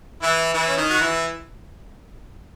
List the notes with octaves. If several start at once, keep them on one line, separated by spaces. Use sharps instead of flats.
E3 E4
E3 E4
C#4
D#3 D#4
F#4
E3 E4